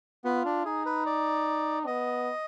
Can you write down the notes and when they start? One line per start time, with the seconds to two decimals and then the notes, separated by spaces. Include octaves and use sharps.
0.25 B3 F4
0.45 D4
0.65 D#4 G#4
0.86 B4
1.06 D5
1.86 B3 D#5